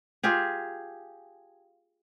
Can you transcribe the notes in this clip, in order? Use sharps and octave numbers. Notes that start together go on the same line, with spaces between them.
F4 G4 G#4